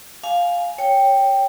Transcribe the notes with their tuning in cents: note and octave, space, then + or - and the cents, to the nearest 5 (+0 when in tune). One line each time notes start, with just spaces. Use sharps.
F5 +5 G#5 +20
C#5 +0 G5 +0